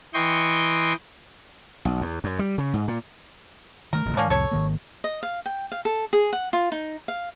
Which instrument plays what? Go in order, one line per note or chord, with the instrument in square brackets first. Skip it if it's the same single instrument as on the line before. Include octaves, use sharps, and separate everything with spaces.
[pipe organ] E3 D#5 G5 C6 C#6
[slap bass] B1
E2
F#2
G3
C#3
G#2
A#2
[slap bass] D#3 A3 [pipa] A#4
[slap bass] D1 A1 A#2
[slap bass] G#2 D#3 [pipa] A#3 C#4 D4
[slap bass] C2 F2 A2 [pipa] A4 C#5
[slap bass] G#1 D#3 A#3
[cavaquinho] D#5
F5
G5
F5
A4
G#4
F#5
F4
D#4
F5